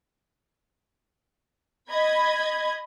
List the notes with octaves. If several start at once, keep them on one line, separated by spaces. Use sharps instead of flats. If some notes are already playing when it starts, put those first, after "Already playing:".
D#5 B5 G#6